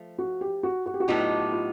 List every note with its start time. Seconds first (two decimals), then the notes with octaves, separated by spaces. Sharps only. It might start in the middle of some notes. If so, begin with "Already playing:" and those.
Already playing: F3 A3
0.19 F#4
0.41 G4
0.63 F#4
0.86 F#4
0.94 G4
1.00 F#4
1.08 A2 F#3 B3 D#4 F4 G4
1.52 F4